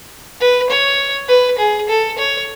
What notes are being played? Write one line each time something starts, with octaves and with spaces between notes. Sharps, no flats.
B4
C#5
B4
G#4
A4
C#5